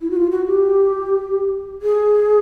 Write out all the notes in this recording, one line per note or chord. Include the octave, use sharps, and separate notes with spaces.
E4
F#4
F4
F#4
G4
G#4